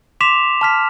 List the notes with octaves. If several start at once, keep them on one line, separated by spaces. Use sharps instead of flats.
C6 D6 B6 E7 F7
A5 F6 B6